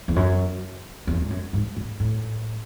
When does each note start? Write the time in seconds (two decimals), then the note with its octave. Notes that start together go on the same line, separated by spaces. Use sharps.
0.08 E2
0.16 F#2
1.07 E2
1.22 G#2
1.30 F#2
1.53 G#2
1.76 A2
2.00 A2